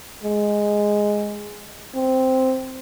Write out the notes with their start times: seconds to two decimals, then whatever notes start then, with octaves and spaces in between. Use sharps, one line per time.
0.24 G#3
1.95 C4